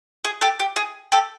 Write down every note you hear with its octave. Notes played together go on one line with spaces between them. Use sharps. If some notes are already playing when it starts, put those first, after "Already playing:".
G#4
G4 A4
G4
G#4
G4 A4